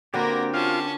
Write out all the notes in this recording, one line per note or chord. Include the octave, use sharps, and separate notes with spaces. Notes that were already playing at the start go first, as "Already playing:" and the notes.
D3 A#3 C4 F#4 G4 A#4 B4
C#4 F4 A5